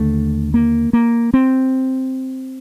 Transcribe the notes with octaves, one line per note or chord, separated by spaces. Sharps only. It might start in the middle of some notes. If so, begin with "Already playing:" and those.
Already playing: D#2 D3 A3
A#3
A#3
C4